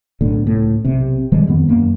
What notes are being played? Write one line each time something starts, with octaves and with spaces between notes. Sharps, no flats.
B1 A2 D3
C#2 A2
B1 C3
A#2 D#3 G3 G#3
F2 D#3 B3
F#2 A#3